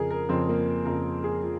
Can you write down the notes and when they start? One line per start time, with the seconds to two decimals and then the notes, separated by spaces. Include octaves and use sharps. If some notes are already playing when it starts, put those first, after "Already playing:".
Already playing: F2 C#3 F3 G#4 A#4
0.11 A#4
0.29 F2 C#3 F3 C4
0.49 A#3
0.85 F2 C#3 F3 A#4
1.24 G#4
1.43 F3